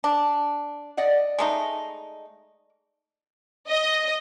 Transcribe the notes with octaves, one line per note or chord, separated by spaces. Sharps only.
D4
D5 D#5 F#5
G#3 A3 D#4
D#5